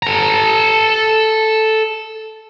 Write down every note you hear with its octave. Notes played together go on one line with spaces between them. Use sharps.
A4 A#5